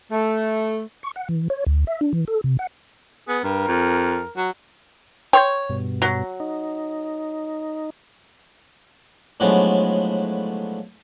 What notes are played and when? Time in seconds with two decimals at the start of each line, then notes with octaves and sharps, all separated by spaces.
0.12 A3
1.03 C#6
1.16 F#5
1.29 E3
1.50 C#5
1.67 D2
1.87 E5
2.01 D4
2.13 E3
2.28 A4
2.44 C3
2.59 F#5
3.28 B3 G#4
3.44 G2 A#4
3.68 F2
4.37 F#3
5.33 C#5 G5 C6 G6
5.69 G2 B2
6.02 F#3
6.40 D#4
9.40 A2 D3 F3 F#3 G#3 B3